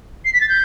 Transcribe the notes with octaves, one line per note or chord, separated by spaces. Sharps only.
C7
B6
A6
G6